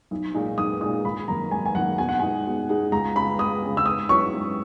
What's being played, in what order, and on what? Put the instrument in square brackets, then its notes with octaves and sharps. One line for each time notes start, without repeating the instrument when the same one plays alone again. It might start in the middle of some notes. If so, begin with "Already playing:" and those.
[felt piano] B1
A#2 G#3 D#4
[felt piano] B1 [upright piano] D#6
[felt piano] A#2 G#3 D#4 [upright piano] D#6
[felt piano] G#1 [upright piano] B5
[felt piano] F#2 D#3 A#3 [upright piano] A#5
[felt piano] G#1 [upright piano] G#5
[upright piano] G#5
[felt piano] F#2 D#3 A#3 [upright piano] F#5
[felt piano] B2 [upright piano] G#5
[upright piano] F#5
[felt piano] G#3 D#4 G#4 [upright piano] G#5
[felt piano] B2
G#3 D#4 G#4
[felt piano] C#2 [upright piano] A#5
[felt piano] C#3 G#3 [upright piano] B5
[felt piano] C#2 [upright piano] D#6
[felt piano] C#3 G#3
[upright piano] E6
[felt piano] G#2 [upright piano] D#6
[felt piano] F#3 C#4 E4 B4 [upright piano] C#6
[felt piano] G#2